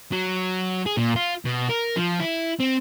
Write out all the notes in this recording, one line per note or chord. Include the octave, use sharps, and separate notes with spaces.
F#3
G#4
A#2
F4
B2
A#4
F3
E4
C4